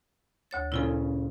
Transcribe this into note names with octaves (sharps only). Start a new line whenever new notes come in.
D2 C#5 A6
A#2 C#3 E4 F4 A4